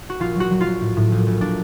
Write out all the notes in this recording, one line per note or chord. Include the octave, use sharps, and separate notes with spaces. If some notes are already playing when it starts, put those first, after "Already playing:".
F#4
A#1 F4
F#3 F#4
F#3
F4
F#3
A2
A2
A#1
A#1
A#3 D4